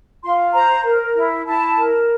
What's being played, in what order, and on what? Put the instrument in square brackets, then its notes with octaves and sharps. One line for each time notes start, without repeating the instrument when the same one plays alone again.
[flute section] F4 C6
C5 A#5
A#4
E4
E4 A5
A#4